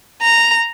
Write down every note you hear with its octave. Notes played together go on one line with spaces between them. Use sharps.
A#5